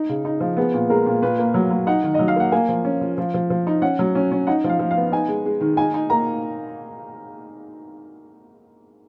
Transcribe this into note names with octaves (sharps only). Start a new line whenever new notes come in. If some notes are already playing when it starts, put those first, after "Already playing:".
Already playing: D#4
C#3
D#4
F3
B3 G#4
A#2
G#3 A#4
A#2
A#2 B4
A#3
F#3
F#3
D#4 F#5
D#3
F#3 D#5
F5
A#3 F#5
A#3 G#5
F3
C#4
F3
F3
F3
F3
D#4
C#4 F#5
F#3
C#4
C#4
D#4 F#5
F3
F5
F3
F5
B3
D#4 G#5
G#3
G#3
D#3
D#4 G#5
D#4
A#3 A#5